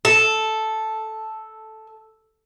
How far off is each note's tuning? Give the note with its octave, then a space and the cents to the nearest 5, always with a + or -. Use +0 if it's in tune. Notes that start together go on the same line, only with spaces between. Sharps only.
A4 -5